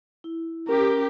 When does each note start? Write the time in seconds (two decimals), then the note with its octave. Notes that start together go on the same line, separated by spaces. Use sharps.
0.24 E4
0.68 C#4 G4 A#4